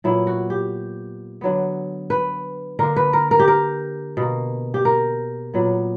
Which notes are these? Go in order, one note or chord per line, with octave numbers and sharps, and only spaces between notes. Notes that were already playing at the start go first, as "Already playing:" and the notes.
A#2 F#3 B3 E4
F#4
G4
D3 F#3 B3
B4
D3 A#3 A#4
B4
A#4
A#4
G4
A#4
B2 A#3
G4
A#4
A#2 F#3 B3